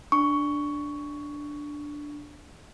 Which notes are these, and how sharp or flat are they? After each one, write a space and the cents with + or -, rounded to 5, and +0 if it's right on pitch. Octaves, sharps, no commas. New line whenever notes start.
D4 +0 C#6 +10